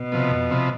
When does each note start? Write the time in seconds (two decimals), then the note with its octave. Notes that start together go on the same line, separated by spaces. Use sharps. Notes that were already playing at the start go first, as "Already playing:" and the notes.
Already playing: B2
0.12 C3 F3 B3
0.31 F2
0.50 C3 F3 B3